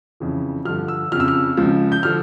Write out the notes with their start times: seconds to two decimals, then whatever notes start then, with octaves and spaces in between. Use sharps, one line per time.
0.20 F2 C#3 E3
0.65 G2 D3 F3 F6
0.88 E6
1.12 F2 C#3 F3 F6
1.20 E6
1.28 F6
1.57 C#2 C#3 F3
1.92 G6
2.03 D3 F3 F6